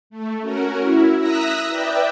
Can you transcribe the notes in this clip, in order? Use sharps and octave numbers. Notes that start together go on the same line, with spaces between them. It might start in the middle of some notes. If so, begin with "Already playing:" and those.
A3
C#4 F#4 A#4
E4
E5 A#5 D#6 E6 F#6 A#6
B4 D5 E5 G5